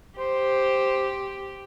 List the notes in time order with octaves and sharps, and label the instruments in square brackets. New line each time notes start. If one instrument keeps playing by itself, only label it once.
[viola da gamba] G4 [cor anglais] C5